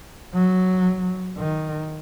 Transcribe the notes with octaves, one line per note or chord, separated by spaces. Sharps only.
F#3
D#3